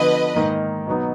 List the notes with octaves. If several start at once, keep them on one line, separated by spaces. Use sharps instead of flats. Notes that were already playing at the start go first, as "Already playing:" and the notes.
Already playing: D3 F3 B3 B4 D#5
G#2 D#3 A#3 D#4
B2 F#3 B3 D#4